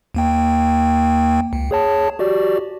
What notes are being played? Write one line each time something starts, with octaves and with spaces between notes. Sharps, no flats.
D#2 A#3 G5
C#2
G#4 C#5 A5
F#4 G4 D5